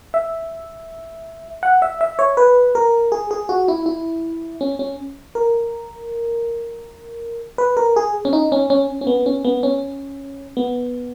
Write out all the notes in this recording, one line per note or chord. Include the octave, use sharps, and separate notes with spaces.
E5
F#5
E5
E5
C#5
B4
A#4
G#4
G#4
F#4
E4
E4
C#4
C#4
A#4
B4
A#4
G#4
C#4
D#4
C#4
C#4
C#4
B3
C#4
B3
C#4
B3